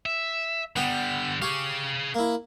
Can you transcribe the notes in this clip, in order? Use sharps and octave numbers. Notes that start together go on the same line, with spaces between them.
E5
D3 G3 B3 G5
G4 G#4 F5 C#6
A#3 E4